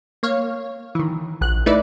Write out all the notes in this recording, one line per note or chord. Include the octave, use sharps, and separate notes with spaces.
A#3 C#5 F5
D#3 E3
A#1 F#6
A3 D#4 E4 B4 D5